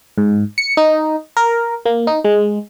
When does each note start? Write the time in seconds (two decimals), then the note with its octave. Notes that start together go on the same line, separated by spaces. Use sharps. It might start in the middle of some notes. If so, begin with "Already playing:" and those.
0.18 G#2
0.58 C#7
0.77 D#4
1.37 A#4
1.86 A#3
2.07 D#4
2.25 G#3